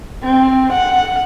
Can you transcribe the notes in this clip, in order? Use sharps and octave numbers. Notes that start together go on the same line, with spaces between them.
C4
F#5